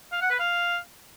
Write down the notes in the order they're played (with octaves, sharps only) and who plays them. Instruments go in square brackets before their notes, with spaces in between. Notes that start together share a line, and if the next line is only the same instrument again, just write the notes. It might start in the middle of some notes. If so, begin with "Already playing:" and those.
[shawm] F5
F#5
B4
F5